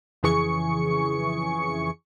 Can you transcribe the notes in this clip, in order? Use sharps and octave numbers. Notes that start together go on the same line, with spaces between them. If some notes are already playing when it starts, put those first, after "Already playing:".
F2 C#3 E3 G#4 C#6 C#7